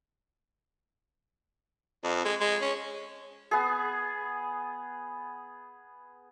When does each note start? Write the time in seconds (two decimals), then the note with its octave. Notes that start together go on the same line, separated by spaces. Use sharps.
2.04 F2
2.25 G#3
2.41 G#3
2.61 C#4
3.51 B3 G#4